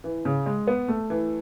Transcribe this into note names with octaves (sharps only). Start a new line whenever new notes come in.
E3
C#3
G#3
B3
A3
E3